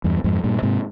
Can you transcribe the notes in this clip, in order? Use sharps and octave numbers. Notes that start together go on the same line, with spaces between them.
E2 G2
F2 G#2
G2 A#2
G#2 C3